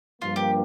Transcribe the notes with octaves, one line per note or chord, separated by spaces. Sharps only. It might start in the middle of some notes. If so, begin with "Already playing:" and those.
G2 F3 A#3 F4
G4